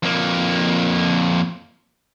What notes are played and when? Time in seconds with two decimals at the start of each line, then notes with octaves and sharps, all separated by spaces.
0.03 F2 A#3